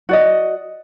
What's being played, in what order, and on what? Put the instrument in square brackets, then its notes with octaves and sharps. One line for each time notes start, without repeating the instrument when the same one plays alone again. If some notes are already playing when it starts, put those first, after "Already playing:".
[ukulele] F#4 D5 D#5